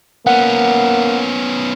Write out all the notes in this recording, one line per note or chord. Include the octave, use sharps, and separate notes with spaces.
A#3 B3 C#4 F#5